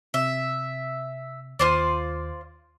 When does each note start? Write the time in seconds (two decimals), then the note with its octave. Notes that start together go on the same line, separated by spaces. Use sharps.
0.14 C3 E5
1.59 D#2 F4 C5 D5